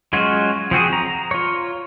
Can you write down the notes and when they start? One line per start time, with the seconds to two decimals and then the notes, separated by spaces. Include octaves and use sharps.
0.13 F#3 G#3 C#4 F4 F#4
0.71 F3 C4 F#4 G#4
0.93 A#5
1.31 F4 C#5